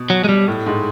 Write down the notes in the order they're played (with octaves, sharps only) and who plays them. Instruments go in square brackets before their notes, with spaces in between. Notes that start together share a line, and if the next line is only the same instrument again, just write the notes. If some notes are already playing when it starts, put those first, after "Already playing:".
Already playing: [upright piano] B2
[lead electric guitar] F#3
G#3
G3
[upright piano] A2
G#2